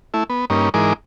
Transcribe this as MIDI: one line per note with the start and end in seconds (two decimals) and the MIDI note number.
0.14 0.24 57
0.14 0.24 64
0.30 0.45 59
0.50 0.69 43
0.50 0.69 58
0.50 0.69 61
0.50 0.69 63
0.74 0.93 44
0.74 0.93 52
0.74 0.93 56
0.74 0.93 63
0.74 0.93 70
0.74 0.93 86